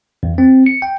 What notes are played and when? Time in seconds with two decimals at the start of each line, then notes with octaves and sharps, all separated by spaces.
0.23 E2
0.38 C4
0.66 C#7
0.82 G5